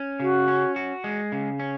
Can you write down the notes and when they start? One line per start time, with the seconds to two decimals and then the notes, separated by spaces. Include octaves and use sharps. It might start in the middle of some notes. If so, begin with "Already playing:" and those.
Already playing: C#4
0.20 C#3 F#4
0.48 C#4
0.76 F#4
1.04 G#3
1.32 C#3
1.60 C#4